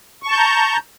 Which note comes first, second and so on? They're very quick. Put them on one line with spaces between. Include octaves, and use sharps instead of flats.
C#6 A5 G6 A#5